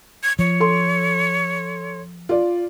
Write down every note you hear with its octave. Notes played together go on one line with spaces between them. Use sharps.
G#6
F3 C#5
A4 C6
F4 D5